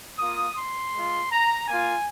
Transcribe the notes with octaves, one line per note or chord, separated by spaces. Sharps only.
A#3 F4 D#6
C6
G#3 F4
A#5
A#3 F4 G#5